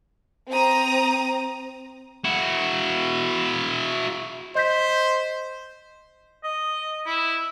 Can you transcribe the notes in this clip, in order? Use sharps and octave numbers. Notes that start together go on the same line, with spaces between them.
C4 A#5 D#6
E4 F#4
C5 D#5 G6 B6
D#5
E4